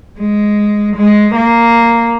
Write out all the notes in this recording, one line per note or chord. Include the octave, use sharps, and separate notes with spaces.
G#3
G#3
A#3